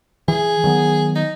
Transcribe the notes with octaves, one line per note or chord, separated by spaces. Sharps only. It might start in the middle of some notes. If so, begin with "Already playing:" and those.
E3 G#4
D#3 F#3 B3
D#4